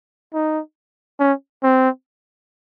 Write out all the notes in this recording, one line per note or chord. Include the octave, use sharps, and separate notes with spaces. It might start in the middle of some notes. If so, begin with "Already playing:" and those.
D#4
C#4
C4